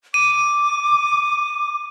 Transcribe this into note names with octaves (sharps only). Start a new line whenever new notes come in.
D6 D#7